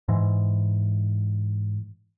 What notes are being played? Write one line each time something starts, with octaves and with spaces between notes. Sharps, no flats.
G#2 E3